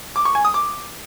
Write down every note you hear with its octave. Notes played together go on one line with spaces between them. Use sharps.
D6
C#6
G#5
D#6
D6